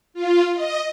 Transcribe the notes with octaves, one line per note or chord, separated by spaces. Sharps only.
F4
D#5